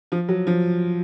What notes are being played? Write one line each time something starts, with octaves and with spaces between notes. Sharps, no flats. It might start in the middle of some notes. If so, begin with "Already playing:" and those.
F3
F#3
F3